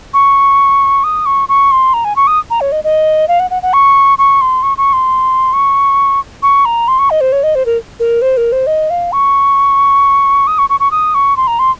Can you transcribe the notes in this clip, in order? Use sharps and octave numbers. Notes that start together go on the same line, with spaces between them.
C#6
D#6
C#6
C#6
C6
A#5
G#5
C#6
D#6
A#5
C#5
D#5
D#5
F5
F#5
F#5
F#5
C#6
C#6
C6
C#6
C#6
C6
C#6
C#6
A#5
C6
C#6
D#5
C5
C#5
D#5
C5
A#4
A#4
C5
A#4
C5
D#5
F5
C#6
D#6
C#6
C#6
C#6
D#6
C#6
C6
A#5
C6